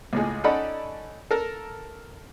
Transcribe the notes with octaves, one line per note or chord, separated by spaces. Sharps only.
C#2 A2 G#3
C#4 D#4 A4 D5 F#5 B5
A4 A#4